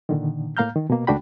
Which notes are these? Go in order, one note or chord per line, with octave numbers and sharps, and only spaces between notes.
A#2 D3 D#3
A2 A#3 F5 A#5 F6 G6
D#3
B2 A#3
C#2 A3 D4 F#4 G5 B5